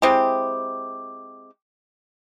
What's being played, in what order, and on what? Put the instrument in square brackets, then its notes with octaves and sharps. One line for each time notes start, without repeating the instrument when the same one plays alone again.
[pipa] G#3 C4 E4 G4